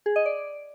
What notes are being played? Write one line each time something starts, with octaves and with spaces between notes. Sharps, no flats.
G#4
D#5
D5